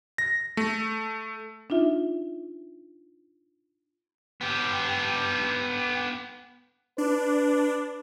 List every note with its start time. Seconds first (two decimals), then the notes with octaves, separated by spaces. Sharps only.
0.18 A#6
0.57 A3
1.70 D4 D#4 F4 E5
4.41 B3 G4
6.98 D4 B4